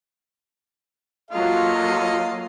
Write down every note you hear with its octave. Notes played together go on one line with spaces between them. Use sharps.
F#3 A#3 F4 A4 D#5 F5